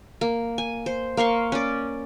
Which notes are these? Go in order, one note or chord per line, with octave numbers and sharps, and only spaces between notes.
A#3
G#5
C5
A#3 F5 C6 C#6
C#4 D5